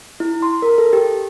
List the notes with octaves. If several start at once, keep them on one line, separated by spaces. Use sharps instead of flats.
E4
C6
A#4
A4
G4